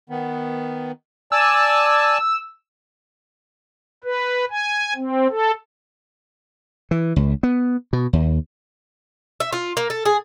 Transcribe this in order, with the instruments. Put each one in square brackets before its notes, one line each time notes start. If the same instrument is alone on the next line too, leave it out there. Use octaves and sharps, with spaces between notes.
[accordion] D#3 B3
[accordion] D5 G#5 A5 [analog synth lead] E6
[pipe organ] B4
G#5
C4
A4
[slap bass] E3
C#2
B3
B2
D#2
[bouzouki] E5
F4
A#3
A4
G#4